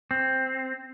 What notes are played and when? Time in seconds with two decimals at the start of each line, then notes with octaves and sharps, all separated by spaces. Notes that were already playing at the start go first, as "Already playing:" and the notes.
0.11 C4